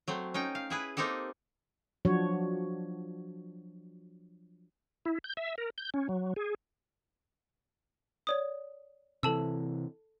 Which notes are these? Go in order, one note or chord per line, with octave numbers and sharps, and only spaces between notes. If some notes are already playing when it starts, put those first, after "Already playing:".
F#3 A3 C4
C#4 D#4 G5
F5
E4 G#4 B4
A#3 C4 D#4 G4 A4
F3 F#3 D4 F#4 C#5
E4
G6
E5
A#4
G6
C#4
F#3
G#4
C#5 D5 D#6
C3 E3 A4 A5 E6